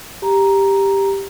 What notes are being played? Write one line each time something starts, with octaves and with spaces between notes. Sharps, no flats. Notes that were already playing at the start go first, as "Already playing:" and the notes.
G4 A#5